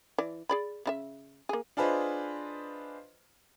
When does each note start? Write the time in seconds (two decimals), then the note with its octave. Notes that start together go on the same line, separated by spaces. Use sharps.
0.18 E3 D5
0.49 G#4 D5 B5
0.86 C#3 E4 E5
1.49 A#3 G#4
1.77 D4 F4 G#4 B4 C5 D#5